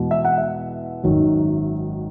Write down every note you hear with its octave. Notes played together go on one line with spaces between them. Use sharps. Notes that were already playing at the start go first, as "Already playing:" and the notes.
Already playing: E2 B2 G#3
E5
F#5
E5
G#1 F#2 D#3 F#3